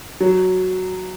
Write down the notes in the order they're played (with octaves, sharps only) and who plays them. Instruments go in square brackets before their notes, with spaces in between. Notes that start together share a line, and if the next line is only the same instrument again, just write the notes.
[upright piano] F#3